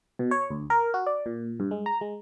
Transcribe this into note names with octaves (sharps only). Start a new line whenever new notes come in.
B2
C#5
D2
A#4
F#4
D5
A#2
G2
G#3
A#5
G#3